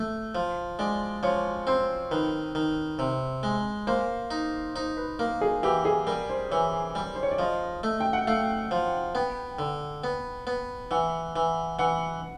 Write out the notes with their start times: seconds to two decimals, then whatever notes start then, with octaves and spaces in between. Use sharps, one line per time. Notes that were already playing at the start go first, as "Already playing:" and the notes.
Already playing: A3
0.35 F3
0.79 G#3 D5
1.23 F3 C#5
1.67 C4 C5
2.11 D#3 B4
2.55 D#3
2.99 C3
3.43 G#3
3.87 A#3 C5
4.31 D#4
4.75 D#4 C5
4.97 B4
5.19 A#3 A#4
5.41 G#4
5.63 E3 G4
5.85 G#4
6.07 G3 A#4
6.29 C5
6.51 E3 C#5
6.95 G3 D5
7.15 C5
7.23 C#5
7.31 D5
7.39 F3 D#5
7.83 A3
8.00 G5
8.13 F#5
8.27 A3 F5
8.71 F3
9.15 B3 G5
9.59 D3
10.04 B3
10.47 B3
10.91 E3 F#5
11.36 E3
11.79 E3 F#5